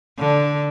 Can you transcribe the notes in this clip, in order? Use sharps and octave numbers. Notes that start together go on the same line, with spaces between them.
D3